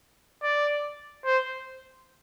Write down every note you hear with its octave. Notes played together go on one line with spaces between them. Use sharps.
D5
C5